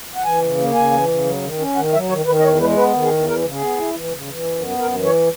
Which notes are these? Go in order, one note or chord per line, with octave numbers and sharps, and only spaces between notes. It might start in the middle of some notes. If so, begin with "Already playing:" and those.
F#5
E3 G#5
C#3
A#3
C#3 G#5
E3
C#3
F#3
D#3
C#4
D#3 F#5
F#3 E5
D#3 C#5
D#3 B4
D#5
E2 C#5
G#3 B4
B3 B4
D#3
G#4
E2
E3 A#4
C#3
G#4
B3
E4
E3
C#3
E3
F#2
B3
F#2 A#4
E3
C#5